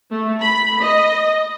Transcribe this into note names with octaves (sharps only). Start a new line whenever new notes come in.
A3
B5
D#5